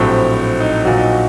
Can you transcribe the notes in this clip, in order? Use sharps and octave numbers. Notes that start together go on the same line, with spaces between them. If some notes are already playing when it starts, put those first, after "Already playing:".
Already playing: A#1 A2 F#3 C4 G4
D#4
A#1 A#2 F#3 F#4
D#4
F#4